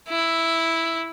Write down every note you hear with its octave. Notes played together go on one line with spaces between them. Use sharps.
E4